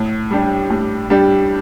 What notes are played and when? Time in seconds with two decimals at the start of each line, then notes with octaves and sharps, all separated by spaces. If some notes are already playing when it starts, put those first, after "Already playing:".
Already playing: A2
0.31 G3 D4 G4
0.70 A2
1.10 G3 D4 G4